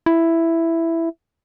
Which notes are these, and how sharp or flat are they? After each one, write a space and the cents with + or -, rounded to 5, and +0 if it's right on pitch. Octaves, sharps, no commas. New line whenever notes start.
E4 +5